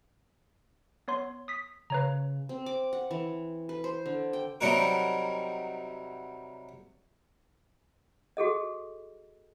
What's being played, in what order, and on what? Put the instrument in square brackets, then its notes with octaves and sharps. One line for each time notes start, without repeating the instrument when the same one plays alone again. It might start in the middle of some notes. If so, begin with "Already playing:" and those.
[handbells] B3 C#5 C6
D#6 B6
[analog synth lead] C#3 [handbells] B4 C#5 A#5
[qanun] C4
D6
F#5
E3
B4
C5
D3
G5
[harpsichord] C3 F#3 G3 D#4 F#4 A#4
[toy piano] F#4 G#4 A4 D#5